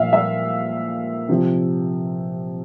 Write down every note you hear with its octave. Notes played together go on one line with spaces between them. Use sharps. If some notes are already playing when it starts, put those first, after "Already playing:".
Already playing: A#2 F3 E5 F5
E5
C3 F3